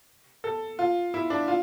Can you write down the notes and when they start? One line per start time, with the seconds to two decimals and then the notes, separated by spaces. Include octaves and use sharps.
0.44 A4
0.79 F4
1.14 E4
1.30 D4
1.48 F4